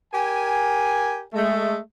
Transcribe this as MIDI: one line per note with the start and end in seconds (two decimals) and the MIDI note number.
0.14 1.22 67
0.14 1.22 70
0.14 1.22 80
1.34 1.77 56
1.34 1.77 57